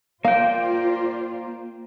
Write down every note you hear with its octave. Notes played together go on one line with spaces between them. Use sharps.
A#3 F4 C5 D5 F5 G5